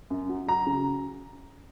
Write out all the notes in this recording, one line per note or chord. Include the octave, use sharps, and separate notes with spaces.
F#2
F#3
F#3 A#5
C#3